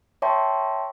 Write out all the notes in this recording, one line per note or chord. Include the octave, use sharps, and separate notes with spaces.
C#5 E5 G5 A5 C6 C#6